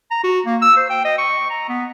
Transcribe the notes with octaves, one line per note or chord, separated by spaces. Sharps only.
A#5
F#4
A#3
E6
C5
G5
D#5
C#6
A#5
B3